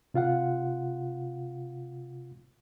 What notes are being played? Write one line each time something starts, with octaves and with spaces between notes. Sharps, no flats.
C3 F4 F5 F#5